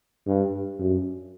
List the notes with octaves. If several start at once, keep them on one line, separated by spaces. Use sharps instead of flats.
G2
F#2